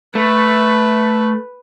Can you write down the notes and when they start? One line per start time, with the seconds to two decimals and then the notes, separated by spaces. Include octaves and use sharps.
0.15 A3 B4